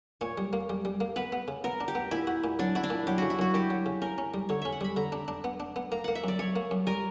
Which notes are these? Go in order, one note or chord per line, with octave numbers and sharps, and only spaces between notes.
A#2 C#5
G3
A#3
G3
G3
A#3
B3 B4
B3
C#3
B3 A#4
D4
G4
B3
A#2 E4
F#4
A#2
F#3 D4
E4 F#4
D4
A#2
F#3 G4
C#3 F#4
E4
F#2 F#4
F#2 G4
F#3
C#3
C#4 A#4
C#4
G3
D3 C#5
C#4 E5
F#5
G3 B5
D3 A#5
D4
D4
B3
D4
B3
A#3 A#5
A#3 F#5
E5
F#2 D5
F#2 C#5
A#3
F#2
G3 A#4